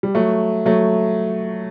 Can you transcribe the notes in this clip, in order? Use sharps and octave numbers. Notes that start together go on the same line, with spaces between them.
G3
F#3 A3
F#3 A3